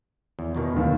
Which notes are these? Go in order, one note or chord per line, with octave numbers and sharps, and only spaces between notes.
E2
E2 B2 D#3
D1 D#2